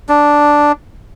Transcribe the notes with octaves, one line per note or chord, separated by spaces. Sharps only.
D4